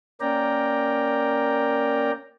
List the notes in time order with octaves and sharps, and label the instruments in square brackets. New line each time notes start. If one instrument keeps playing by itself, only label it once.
[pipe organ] A#3 C#4 A#4 D5 G5 A#5